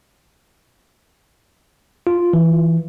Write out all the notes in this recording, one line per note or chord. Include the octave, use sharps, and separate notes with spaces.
F4
E3